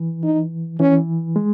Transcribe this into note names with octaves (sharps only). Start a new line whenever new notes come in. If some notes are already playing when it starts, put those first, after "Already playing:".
Already playing: E3
D#4
E3 C#4
G#3